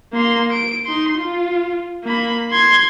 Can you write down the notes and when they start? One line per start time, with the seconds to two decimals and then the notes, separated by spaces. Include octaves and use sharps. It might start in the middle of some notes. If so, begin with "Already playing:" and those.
0.13 A#3 C6
0.52 D7
0.86 D#4 C6
1.18 F4
2.04 A#3 B5
2.51 C6 G#6